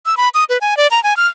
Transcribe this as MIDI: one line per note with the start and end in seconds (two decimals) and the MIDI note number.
0.06 0.15 88
0.17 0.29 83
0.34 0.44 87
0.49 0.58 71
0.61 0.77 80
0.77 0.87 74
0.91 1.02 82
1.04 1.16 80
1.17 1.27 89